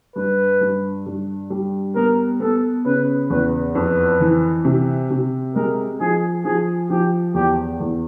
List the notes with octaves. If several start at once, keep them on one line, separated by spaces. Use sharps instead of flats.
G2 B4
G2
G2
G3
B3 A#4
B3 A4
C#3 B4
E2 B4
F2 B4
E3
C3
C3
G#3 A#4
F3 G#4
F3 G#4
F3 G4
E2 G4
E2